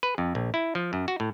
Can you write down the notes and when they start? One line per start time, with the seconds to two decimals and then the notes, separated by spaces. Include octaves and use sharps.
0.03 B4
0.18 F2
0.35 A#1
0.54 E4
0.75 F3
0.93 F#2
1.08 F#4
1.20 A2